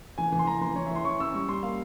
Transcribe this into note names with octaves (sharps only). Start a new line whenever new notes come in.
E3 G#5
E3
C6
E3 A#5
E3 C6
E3 C#5
E5
E3 C6
C#4 C#6
C#4 E6
G3 C#6
G3 C6
A#3 F5